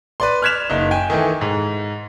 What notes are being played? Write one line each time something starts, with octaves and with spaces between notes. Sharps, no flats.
B4 D5 C6
F6 F#6 G#6 B6 E7 F7
F#1 D#4
G5 G#5
D#3 E3 A3
G#2